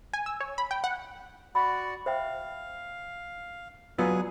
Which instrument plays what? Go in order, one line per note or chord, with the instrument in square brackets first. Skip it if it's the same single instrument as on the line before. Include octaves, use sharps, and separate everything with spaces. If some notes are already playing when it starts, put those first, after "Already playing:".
[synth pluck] G#5
E6
C#5
B5
G5
F#5
[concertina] F#4 D5 F#5 [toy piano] B5 C#6
[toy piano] C5 E5 G5 [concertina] F5
[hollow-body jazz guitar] F#3 B3 F4 [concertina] G#4 B4 G#5 [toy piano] D5 E6